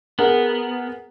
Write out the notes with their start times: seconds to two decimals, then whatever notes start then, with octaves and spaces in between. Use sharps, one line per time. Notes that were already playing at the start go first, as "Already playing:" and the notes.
0.19 B3 G#4 A#4 F#5